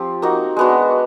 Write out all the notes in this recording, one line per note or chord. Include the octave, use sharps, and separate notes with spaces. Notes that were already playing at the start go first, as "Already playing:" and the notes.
Already playing: F3 C4 F4 G4
A#3 D#4 F#4
G#3 B3 D4 F#4